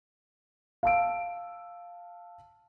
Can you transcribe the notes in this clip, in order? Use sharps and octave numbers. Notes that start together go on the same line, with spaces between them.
F5 A5 E6 D7